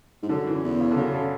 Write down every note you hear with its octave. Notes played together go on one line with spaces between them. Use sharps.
G#2
F#2 D3
E3
E2
C#3
D3
F#2 C#3
D3